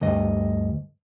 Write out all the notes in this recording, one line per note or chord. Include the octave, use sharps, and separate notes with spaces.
D2 G2 D#5